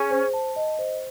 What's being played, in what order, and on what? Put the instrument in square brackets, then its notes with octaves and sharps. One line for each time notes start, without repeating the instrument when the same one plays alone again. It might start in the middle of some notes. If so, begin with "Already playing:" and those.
Already playing: [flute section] C#4 [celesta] G#4
[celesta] C5
A5
D#5
C5